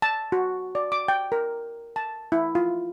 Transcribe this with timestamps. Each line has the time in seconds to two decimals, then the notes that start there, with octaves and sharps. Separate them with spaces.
0.02 A5
0.32 F#4
0.75 D5
0.92 D6
1.08 G5
1.32 A#4
1.96 A5
2.32 E4
2.55 F4